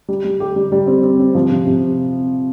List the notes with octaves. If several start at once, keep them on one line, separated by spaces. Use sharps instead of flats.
G3
G3
G4
G3
G3
C4
C4
C4
F3
C3
C3